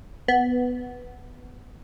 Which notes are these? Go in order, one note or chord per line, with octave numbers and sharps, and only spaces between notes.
B3